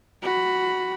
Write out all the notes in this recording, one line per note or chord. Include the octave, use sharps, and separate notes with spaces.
F#4 B5